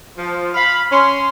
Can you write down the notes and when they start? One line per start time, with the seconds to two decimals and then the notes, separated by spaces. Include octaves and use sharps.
0.17 F3
0.55 F5 B5
0.90 C#4 C6